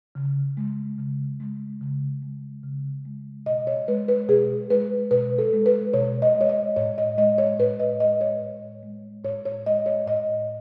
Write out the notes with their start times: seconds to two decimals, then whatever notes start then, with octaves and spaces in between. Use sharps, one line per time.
0.15 C#3
0.57 G#3
0.98 C#3
1.40 G#3
1.81 C#3
2.22 G#3
2.63 C#3
3.05 G#3
3.46 B2 D#5
3.67 C#5
3.88 G#3 B4
4.08 B4
4.29 B2 G#4
4.70 G#3 B4
5.11 B2 B4
5.38 A4
5.53 G#3
5.66 B4
5.94 B2 C#5
6.22 D#5
6.35 G#3
6.41 C#5
6.49 D#5
6.76 A2 C#5
6.98 D#5
7.18 G#3 D#5
7.38 C#5
7.59 A2 B4
7.80 D#5
8.00 G#3 D#5
8.21 C#5
8.42 A2
8.83 G#3
9.24 A2 C#5
9.45 C#5
9.66 G#3 D#5
9.86 C#5
10.07 A2 D#5